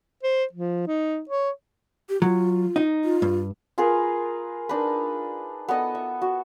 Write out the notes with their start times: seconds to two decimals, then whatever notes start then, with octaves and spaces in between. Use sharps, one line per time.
0.23 C5
0.53 F3
0.87 D#4
1.29 C#5
2.09 G4
2.22 F#3 F4
2.76 D#4
3.04 F4
3.22 G2
3.78 F4 G#4 A#4 B4
4.69 D4 D#4 A#4 B4
5.68 B3 A4 D#5
5.95 E5
6.22 F#4